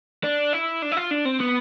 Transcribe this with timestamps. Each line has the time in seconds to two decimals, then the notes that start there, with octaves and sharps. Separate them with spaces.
0.24 D4
0.53 E4
0.82 D4
0.92 E4
0.97 F4
1.11 D4
1.25 C4
1.40 B3